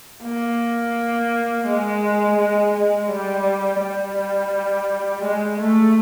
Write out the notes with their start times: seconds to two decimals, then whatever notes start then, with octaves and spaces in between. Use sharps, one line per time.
0.23 A#3
1.67 G#3
2.38 G#3
2.73 G#3
3.10 G3
3.81 G3
5.24 G#3
5.59 A3